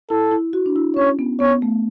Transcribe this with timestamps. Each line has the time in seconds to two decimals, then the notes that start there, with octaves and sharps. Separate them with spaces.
0.10 E4 A4
0.31 E4
0.53 F#4
0.66 D4
0.76 E4
0.97 C#4 C#5
1.19 B3
1.40 B3 C#5
1.62 A3